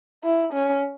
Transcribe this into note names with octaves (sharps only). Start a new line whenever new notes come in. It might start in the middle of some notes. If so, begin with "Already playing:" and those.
E4
C#4